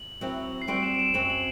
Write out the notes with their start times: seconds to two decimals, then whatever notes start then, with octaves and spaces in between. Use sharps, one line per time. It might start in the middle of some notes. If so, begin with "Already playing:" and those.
Already playing: F#7
0.21 F#3 C4 E4
0.62 C7
0.68 G3 C4 F#4 C5 D7
0.83 E7
0.95 D7
0.99 E7
1.14 F#2 F#3 C4 F#4 F#7
1.30 F#7